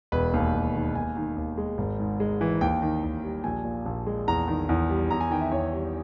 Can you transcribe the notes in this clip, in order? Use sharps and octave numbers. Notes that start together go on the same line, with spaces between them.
E1 B4
D#2
E1
D#3
D#2 G#5
D#3
D#2
G#3
G#1
G#2
G#3
E3
D#2 G5
D#3
D#2
G3
A#1 G#5
A#2
A#1
G#3
E2 A#5
D#3
E2
G3
E2 A#5
G#5
D#3 G5
E5
E2 C#5
G3